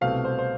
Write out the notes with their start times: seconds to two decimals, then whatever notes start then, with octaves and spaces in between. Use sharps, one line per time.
0.01 C2 B2 A3 C4 F5
0.25 C5
0.39 C5